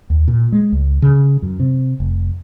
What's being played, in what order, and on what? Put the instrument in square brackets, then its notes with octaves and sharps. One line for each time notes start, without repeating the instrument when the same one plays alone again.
[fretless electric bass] D#2
A#2
G#3
C#2
C#3
F#2
C3
F1